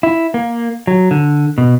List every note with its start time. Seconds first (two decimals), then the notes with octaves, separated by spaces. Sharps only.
0.03 E4
0.34 A#3
0.87 F#3
1.11 D3
1.58 B2